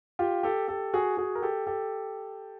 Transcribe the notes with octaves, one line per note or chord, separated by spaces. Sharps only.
F4 G4
G4 A4
G4 A4
F#4 G#4
F#4 G#4
A#4
G4 A4
G4 A4